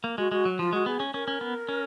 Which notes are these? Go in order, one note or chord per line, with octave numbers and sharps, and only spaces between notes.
A#3
G#3 F#4
G#3 F#4
F#3
F3 F4
G#3 F#4
B3 G#4
C#4
C#4 A#4
C#4
B3
C#4